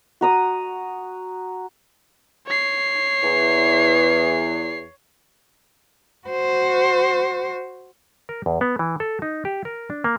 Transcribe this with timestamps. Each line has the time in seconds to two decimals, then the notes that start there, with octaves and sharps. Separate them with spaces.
0.21 F#4 A#5 D#6
2.47 C#5 C7
3.23 E2
6.28 F#4 C5
8.29 A#4
8.46 E2
8.61 B3
8.79 E3
9.00 A4
9.22 D#4
9.45 G4
9.65 A#4
9.90 D4
10.04 A#3